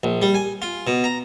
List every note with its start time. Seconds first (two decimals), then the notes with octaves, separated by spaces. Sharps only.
0.03 A#1
0.22 G3
0.34 G#5
0.62 F4
0.87 B2
1.04 A#5